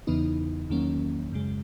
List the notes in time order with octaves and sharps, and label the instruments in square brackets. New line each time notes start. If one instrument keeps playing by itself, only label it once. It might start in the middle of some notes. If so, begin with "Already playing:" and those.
[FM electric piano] E2 C#3 E3 B3 D#4
E2 D#3 F#3 A#3 C#4
F#2 C#3 G#3